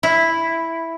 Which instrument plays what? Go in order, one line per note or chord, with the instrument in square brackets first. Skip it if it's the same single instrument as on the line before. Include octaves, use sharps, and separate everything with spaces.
[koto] E4